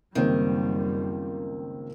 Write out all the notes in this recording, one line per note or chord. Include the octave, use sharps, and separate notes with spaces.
C#2 F#2 D#3 G3 A#3 C4